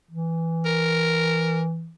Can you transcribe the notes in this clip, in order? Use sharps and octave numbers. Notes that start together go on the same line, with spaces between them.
E3
A#4